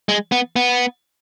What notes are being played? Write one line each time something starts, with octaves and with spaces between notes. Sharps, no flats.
G#3
B3
B3